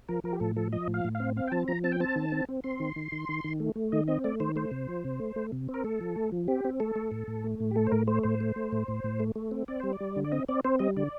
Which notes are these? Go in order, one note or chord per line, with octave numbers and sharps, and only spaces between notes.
F3 A#4
F3 A#4
G4
A2 A4
F3 A4
F3 D#5
A2
F5
A2
F5
C4
C4 F5
G5
F3 A5
F3 A#5
C4 A5
G5
C4 A5
D#3
C4
C4
C4 C6
D#3
D#3
D#3
D#3
D#3
A3
A3
D#3 D#5
C4 D#5
A3 D5
D#3 C5
A3 C5
C3
F3
C3
A3
A3
C3
C4
A#4
A3 A4
F3
A3
F3
C4 G4
C4
A3 A4
A3
A2
A2
A3
A2
G4
A3 A4
C5
A2 A#4
A3 C5
A2 C5
A3
A3
A2
A2
A2
A3
A3
C4
C4 D5
G3 C5
D5
G3
D3
D5
C4 D#5
C4 D5
C4 C5
G3 D#5
D3 D5